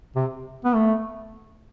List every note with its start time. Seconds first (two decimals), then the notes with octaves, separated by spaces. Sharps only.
0.16 C3
0.65 B3
0.75 A3